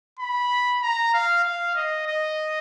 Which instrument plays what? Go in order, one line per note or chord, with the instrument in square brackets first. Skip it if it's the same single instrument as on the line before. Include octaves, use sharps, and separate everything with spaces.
[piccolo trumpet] B5
A#5
F5
F5
D#5
D#5